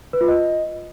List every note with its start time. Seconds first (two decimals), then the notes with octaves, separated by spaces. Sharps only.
0.13 B4
0.21 F4
0.28 D#5